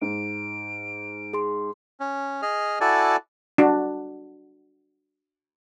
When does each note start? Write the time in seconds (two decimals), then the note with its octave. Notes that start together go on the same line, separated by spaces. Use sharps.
0.02 G#2 D7
1.33 G#4 C6
2.00 C#4
2.42 G#4 D#5 F6
2.81 E4 F#4 A4 D5 G#5 A5
3.58 D4 F#4